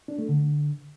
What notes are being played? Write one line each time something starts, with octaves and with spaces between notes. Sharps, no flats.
D4
A3
D3